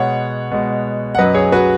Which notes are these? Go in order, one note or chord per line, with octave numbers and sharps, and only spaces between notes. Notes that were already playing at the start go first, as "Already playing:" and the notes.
Already playing: B2 G#3 C#5 F#5
B2 G#3
F#5
F#2 F#3 B4 D#5
G#4 C#5
F#4 B4